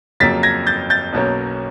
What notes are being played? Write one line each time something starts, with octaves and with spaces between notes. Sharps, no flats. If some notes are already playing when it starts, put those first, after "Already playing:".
F2 C#3 F#3 A#3 A6 B6
G#6 A#6
G6 A6
G6 A6
B1 B2 F#3 A#3 C#4